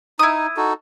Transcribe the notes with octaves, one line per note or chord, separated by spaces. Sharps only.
D#4 E4 D#6
D#4 F#4 A4